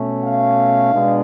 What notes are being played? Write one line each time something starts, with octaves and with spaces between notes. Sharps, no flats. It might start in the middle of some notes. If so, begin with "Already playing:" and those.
Already playing: B2 A3 C#4
F5
B2 G#3 B3 D4